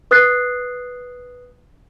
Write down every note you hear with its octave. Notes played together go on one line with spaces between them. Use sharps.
B4 D#6 F#6 A6 C7